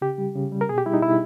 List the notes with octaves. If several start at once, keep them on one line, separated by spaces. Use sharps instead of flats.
C#3 G4
G3
C#3
G3
A#4
B2 G#4
G4
G3 E4
D#4
B2 E4